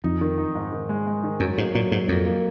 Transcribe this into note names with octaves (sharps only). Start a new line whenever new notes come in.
F2 D#4
D#3
D#4
G#2
D#3
G#3
G#3
D#3
F#2 F#3
G#2 A#3
A#2 F#3
G#2 F#3
F2 A#3
A#3